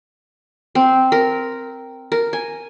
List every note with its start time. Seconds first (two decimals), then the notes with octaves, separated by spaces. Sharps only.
0.75 C4
1.12 A#4
2.12 A#4
2.33 G#5